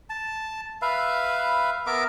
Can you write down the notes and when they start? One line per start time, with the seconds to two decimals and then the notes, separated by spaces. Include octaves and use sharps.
0.10 A5
0.82 B4 E5 F5
1.87 B3 A#4 E5 D6